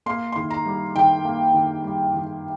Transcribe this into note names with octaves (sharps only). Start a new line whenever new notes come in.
A#3 C6
D#3 C6
A#5
G3
D#3 G5
A#3
D#3
G3
D#3